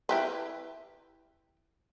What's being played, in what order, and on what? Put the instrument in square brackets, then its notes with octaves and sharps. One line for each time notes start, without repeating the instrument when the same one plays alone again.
[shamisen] E4 G4 B4